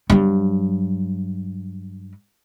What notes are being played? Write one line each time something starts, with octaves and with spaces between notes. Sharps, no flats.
G2 F#3